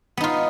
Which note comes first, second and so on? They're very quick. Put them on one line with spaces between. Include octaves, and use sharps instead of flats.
B3 D#4 F4